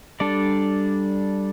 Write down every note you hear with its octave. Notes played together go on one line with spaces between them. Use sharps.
G3 D4 A4 D5